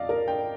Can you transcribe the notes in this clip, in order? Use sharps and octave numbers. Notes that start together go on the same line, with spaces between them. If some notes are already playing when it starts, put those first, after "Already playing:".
Already playing: F2 D5 D#5 F5
A#4
G5